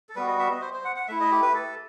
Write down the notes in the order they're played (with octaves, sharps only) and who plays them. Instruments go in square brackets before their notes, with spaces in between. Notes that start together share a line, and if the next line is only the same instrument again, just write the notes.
[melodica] A4
G3 B3 F#4 B4
D#5
E5
D#5
C5
C5
F#5
F#5
A3 E4 E5
D#5
G4
B4
A4